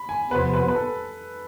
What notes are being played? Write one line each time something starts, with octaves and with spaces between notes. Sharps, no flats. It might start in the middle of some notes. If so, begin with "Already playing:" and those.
Already playing: B5
G#5
E2 C3 F3 B3 F4 B4
B4
B4
A4